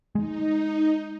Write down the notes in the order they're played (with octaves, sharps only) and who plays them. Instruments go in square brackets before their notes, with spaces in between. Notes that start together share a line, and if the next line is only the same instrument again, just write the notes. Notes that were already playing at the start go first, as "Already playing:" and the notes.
[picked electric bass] G#3 [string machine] D#4